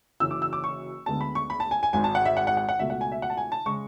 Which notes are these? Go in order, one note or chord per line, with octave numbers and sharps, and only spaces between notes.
F#1 F#2 E3 E6
D6
E6
D6
C#6
D2 D3 G#3 B3 A5
B5
C#6
B5
A5
G#5
G#5
G#1 G#2 G#3 G#5
A5
F#5
E5
F#5
F#5
F#5
F#5
C#2 B2 A3 E5
F#5
G#5
E5
F#5
A5
G#5
A5
C#3 G#3 C#6